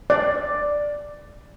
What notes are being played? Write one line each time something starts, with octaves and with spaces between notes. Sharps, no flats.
D5